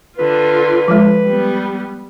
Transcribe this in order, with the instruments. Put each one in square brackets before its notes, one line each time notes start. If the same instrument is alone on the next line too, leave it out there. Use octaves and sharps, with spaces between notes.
[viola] D3 F4 [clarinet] B4
[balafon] F3 G#3
[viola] G3 B3